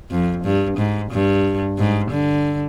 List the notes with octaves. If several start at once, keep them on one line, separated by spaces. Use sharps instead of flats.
F2
G2
G#2
G2
G#2
D3